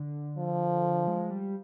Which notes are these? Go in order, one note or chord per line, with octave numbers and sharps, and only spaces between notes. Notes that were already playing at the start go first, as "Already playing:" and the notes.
Already playing: D3
F3
G#3
G3